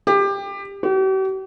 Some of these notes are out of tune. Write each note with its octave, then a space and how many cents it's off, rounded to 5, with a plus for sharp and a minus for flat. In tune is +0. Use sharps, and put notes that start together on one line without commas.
G4 +20
G4 -45